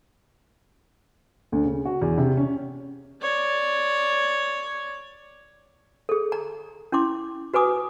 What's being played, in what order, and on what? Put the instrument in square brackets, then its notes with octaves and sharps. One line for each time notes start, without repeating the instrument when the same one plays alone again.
[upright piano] D2
C#3
F#4
E2
C3
C#4
[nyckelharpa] C#5 D5
[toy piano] G#4 A4
A#5
C#4 E4 C6 D6
F#4 B4 G#5 D6 D#6